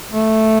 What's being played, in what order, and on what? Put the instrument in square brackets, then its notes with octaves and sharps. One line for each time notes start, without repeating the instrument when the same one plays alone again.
[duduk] A3